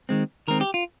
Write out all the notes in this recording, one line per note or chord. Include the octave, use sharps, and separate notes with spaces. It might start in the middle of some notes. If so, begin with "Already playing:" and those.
D#3 G#3 C4
D#3 G#3 C4 A#4
G4
F4